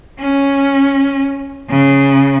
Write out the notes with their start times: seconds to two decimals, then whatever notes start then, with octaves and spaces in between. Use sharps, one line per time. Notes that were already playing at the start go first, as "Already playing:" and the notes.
0.19 C#4
1.69 C#3